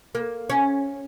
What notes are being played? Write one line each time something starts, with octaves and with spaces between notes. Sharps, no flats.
A#3
C#4